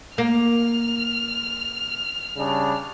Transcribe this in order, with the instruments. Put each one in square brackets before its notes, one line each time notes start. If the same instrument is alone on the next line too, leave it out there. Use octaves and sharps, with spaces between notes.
[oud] A#3 [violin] F6
[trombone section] C#3 G3 D4